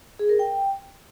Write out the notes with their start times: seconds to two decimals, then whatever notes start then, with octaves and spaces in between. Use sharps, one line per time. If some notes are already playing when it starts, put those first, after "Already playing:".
0.19 G#4
0.29 A#4
0.39 G5